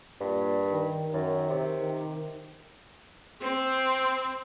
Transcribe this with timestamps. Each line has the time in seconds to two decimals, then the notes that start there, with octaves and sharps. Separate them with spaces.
0.21 G2 A#2
0.72 D#3
1.13 F#2 D#3
1.49 C3
1.80 D#3
3.42 C4